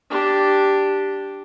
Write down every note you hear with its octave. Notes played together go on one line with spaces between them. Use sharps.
D4 G4